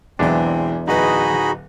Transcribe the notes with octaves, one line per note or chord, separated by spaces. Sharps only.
B1 E2 E3 G#3 C4 D4
D1 D#4 F#4 G#4 B4 D#5 B5